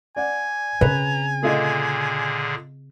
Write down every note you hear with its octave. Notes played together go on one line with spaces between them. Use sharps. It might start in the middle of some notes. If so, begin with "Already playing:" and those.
D5 F#5 G#5
C#3 C4 B4 A#5
A#2 D3 A3 F4 G#4 D#5